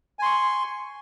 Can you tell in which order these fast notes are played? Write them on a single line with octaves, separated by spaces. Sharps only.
G#5 C6 C#6